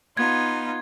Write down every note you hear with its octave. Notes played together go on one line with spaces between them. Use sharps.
B3 D#4 F4 G#6